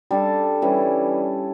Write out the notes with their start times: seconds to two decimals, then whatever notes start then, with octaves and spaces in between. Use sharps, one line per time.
0.11 G3 D4 A4
0.62 E3 G3 C#4 E4